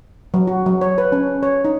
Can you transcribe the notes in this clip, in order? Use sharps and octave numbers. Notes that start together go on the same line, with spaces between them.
F#3
F#4
F#3
C#5
B4
C#4
C#5
D#4